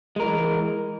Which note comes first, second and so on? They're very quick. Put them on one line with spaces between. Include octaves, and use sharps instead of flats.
G#3 A#4 E3